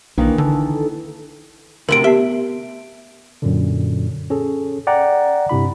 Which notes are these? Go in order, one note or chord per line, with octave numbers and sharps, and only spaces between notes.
B1 D#3 E3 A#3 D4
D3 A4
D2 A2 C3 A#4 D7
B3 G4 E5
F#2 A#2 D3
C#4 G#4 A4
D5 F#5 G5 A#5
G2 C3 E4 B5